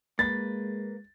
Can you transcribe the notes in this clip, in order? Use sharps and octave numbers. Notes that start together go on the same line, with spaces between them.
G#3 A#3 B4 A6